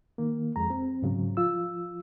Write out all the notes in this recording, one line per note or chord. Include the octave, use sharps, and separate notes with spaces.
D#3 A#3
F2 F3 G#3 A#5
C4
G#2 C#3 F#3
F3 F4 E6